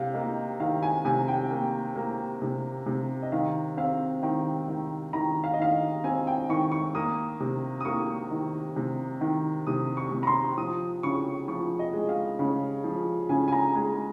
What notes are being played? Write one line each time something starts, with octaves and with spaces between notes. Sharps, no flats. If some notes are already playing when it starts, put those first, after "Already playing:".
Already playing: C3 F5 G5
A#3 D#5
D#3 F5
G#5
C3 G#5
G5
A#3
A#3
C3
C3
D#5
D#3 F5
C4 F5
D#3 G5
D#3
D#3 A#5
F5
D#5
D#3 F5
C4 G#5
G5
D#3 C#6
C#6
A#3 D#6
C3
D#6
A#3 C#6
D#3
C3
D#3
C3 D#6
C#6
C3
A#5
C6
F3 D#6
C#3 C#6
F3 C#6
D#5
G#3
F5
C#3
F3
C#3 G#5
G#5
A#5
G#3 G#5